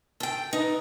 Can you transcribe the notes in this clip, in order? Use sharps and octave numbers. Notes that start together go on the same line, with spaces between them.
A4 G5
D#4 B4